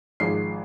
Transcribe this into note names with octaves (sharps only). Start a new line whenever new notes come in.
G#1 G#2 F3 G#3 C7